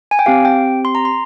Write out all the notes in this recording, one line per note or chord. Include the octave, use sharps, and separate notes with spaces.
G#5
G5
C4 G4 F5
G5
C6
A#5
C6